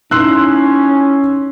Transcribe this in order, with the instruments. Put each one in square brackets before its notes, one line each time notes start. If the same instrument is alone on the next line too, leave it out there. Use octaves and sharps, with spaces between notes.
[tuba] C#4 [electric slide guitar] D#4 E4 [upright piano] C6 E6 F#6